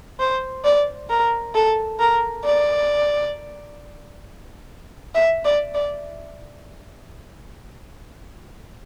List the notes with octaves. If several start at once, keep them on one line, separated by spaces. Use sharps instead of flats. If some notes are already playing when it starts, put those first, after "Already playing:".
C5
D5
A#4
A4
A#4
D5
E5
D5
D5